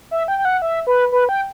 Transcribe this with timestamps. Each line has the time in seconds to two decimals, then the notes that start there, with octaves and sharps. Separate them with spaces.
0.11 E5
0.28 G5
0.38 G5
0.45 F#5
0.62 E5
0.87 B4
1.12 B4
1.29 G5